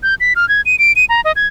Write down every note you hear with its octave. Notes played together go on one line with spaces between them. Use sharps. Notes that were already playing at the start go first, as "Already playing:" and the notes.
G6
B6
F6
G#6
D#7
D7
D#7
A#5
D#5
G#6